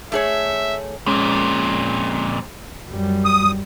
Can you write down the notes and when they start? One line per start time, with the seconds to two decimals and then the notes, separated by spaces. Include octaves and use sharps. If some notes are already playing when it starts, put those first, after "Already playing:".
0.12 A3 G#4 C#5 E5
1.06 F2 A#2 G#3 C#4
2.89 F#2 G3
3.25 D#6